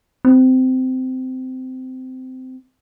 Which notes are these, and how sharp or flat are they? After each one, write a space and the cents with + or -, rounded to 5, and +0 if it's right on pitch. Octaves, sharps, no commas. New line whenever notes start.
C4 -20